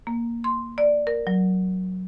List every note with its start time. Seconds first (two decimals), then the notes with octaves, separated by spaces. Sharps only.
0.07 A#3
0.44 C6
0.78 D5
1.07 A#4
1.27 F#3